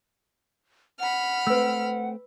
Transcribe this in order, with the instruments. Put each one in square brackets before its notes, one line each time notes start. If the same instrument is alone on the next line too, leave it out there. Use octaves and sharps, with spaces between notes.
[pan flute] F#5 [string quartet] B5 F6
[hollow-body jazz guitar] A3 C4 [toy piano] B4 E6